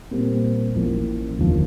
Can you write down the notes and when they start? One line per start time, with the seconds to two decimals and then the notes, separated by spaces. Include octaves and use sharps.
0.11 A#2 G3 C4
0.75 A1 A2 F3 A#3
1.38 F1 D#2 D3 F3